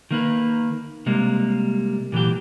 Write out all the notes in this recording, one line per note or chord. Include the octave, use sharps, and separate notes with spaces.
D#3 A#3 B4
C3 G3 G#3 A#3
A#2 E3 F#3 G4